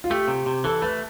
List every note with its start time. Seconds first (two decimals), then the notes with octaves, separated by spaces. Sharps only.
0.04 F4
0.10 A3 G4
0.28 C3
0.46 C3
0.64 E3 A4
0.82 A3 B4